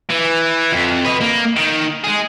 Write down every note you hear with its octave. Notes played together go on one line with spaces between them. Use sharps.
E3
F2
B4 D#5
A#3
D#3
G#3 G#4